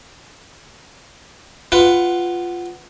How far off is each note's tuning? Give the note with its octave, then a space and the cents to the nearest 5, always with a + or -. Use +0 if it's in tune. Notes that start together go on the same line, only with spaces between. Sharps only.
F4 +0 B4 +10 F#5 +5